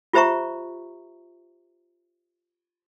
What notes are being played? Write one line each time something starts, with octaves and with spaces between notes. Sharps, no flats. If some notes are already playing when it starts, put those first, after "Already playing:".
F4 G4 C5 E5 A#5 C#6